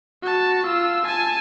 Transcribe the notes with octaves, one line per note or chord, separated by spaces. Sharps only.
F#4 A5
F4 E6
G#5 A5